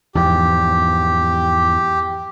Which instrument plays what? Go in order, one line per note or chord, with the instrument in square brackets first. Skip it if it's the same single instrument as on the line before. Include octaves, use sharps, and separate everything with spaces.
[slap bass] E2 G#2 F3 [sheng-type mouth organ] G4